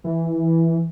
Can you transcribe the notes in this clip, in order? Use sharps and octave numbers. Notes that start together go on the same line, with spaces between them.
E3